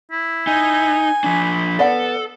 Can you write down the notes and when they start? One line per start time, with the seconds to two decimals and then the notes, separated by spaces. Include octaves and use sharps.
0.11 E4
0.47 D#4 G#5
1.24 F3 D4 B5
1.79 B3 A4 D5 F#5